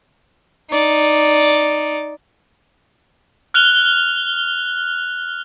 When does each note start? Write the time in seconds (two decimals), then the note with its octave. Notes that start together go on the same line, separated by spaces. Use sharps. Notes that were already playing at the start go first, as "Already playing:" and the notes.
0.71 D#4 D5
3.54 F6 F#6 F7 G7